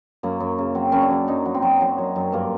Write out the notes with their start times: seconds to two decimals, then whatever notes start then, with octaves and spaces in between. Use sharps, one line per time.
0.23 F#2 A#3
0.40 F#2
0.58 C#3
0.75 F#3 C4
0.92 F#2 C#4
1.02 D4
1.10 F#2
1.28 F#2 D#4
1.45 F#3
1.54 C4
1.62 F#3
1.81 F#3
1.98 F#3
2.16 F#2
2.32 G2 A#3